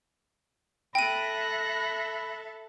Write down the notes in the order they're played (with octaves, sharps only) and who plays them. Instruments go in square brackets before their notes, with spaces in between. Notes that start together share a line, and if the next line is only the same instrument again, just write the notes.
[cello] A4 E5 [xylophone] G5 D#7 [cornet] B5 [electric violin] F#6 A#6